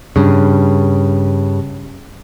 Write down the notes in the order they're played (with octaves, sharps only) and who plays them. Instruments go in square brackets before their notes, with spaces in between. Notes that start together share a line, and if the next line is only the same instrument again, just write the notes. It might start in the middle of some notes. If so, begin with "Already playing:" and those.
[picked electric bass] G2 C#3